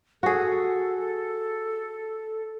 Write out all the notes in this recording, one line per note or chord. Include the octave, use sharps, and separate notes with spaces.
F#4 G#4 A4